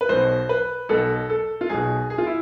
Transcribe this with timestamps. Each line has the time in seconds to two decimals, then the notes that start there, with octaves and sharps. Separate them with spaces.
0.01 B4
0.09 B1 B2 C5
0.49 B4
0.89 B1 B2 A4
1.30 A4
1.61 F4
1.69 B1 B2 G#4
2.10 G#4
2.18 F4
2.27 E4